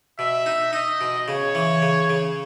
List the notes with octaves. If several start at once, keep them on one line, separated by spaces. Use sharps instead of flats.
B2 E5
D#4
D#4 D#5
B2
C#3 C#5
E3
C#3
C#3